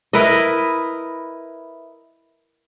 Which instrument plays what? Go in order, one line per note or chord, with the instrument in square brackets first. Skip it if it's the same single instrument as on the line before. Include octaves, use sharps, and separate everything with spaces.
[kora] E4 A#4 B4 D#5